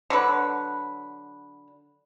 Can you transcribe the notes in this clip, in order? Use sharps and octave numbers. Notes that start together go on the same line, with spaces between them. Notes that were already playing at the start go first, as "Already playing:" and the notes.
D3 F#3 B4